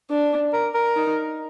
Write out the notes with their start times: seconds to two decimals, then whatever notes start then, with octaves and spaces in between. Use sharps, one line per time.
0.10 D4
0.53 A#4
0.75 A#4
0.96 D#4